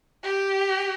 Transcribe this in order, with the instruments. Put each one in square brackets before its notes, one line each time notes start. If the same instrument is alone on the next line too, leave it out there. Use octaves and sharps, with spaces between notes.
[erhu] G4